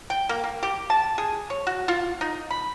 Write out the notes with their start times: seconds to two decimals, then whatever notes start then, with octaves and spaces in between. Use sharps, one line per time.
0.10 G5
0.29 A#3
0.44 A#3
0.63 G4
0.90 A5
1.18 G#4
1.50 C#5
1.67 F#4
1.88 F4
2.21 D#4
2.50 B5